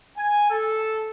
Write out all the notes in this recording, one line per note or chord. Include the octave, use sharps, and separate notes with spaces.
G#5
A4